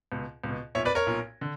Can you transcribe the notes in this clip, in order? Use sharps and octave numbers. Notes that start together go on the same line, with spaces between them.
C#2 B2
C#2 B2
B1 A#2 C#5 E5
B4 D5
A#4 C#5
B1 A#2
D3